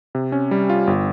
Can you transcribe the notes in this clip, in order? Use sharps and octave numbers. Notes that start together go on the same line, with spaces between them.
C3
C#4
G3
F4
G1